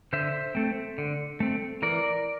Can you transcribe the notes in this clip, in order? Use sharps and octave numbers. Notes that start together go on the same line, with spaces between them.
D3 C5 E5
A3 C4
D3
A3 C4
E3 A#4 D5